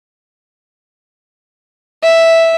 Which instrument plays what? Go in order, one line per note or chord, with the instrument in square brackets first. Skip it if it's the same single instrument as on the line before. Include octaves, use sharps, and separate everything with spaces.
[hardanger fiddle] E5